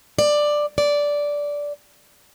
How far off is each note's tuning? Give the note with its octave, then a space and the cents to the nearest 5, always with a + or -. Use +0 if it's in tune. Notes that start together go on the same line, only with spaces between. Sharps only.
D5 +10
D5 -10